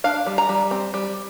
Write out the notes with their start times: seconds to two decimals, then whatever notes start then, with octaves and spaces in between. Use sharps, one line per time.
0.04 D4 F5
0.26 G3
0.38 A#5
0.49 G3
0.71 C4
0.94 G3